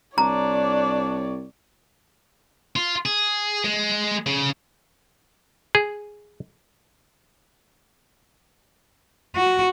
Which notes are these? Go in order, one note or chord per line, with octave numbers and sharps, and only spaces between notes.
C2 D4 C#5 D5 A#5
F4
G#4
G#3
C#3
G#4
F#4